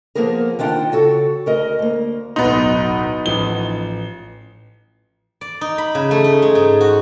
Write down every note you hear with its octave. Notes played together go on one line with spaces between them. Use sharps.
F3 A#3 B3 G#4 A#4
D#3 D4 F4 E5 F#5 G5
C#3 F#4 A4
D2 A#4 D#5
D2 A#3
D1 B1 B3 D#4 C6
A1 F3 G7
D5
D#4
B5
C#3
A3
D#4
G#3
G#2
F#4